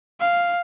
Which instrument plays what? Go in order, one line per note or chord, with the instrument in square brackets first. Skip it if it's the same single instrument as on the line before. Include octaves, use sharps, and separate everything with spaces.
[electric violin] F5